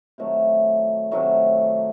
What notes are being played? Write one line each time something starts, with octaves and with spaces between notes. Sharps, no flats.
C3 D#3 F#3 A3
C3 D#3 F#3 A3